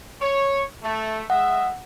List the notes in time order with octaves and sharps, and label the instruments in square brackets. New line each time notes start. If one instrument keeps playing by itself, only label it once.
[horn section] C#5
A3
[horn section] G#3 D#5 E5 [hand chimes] F#5